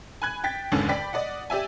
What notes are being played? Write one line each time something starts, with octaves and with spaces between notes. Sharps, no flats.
G#5 B5 F#6 G#6
G5 A6 B6
F1 D#2 G#2 D3 C#4
D5 G5 B5 B6
D5 D#5 F#5
G4 D5 E5 G#5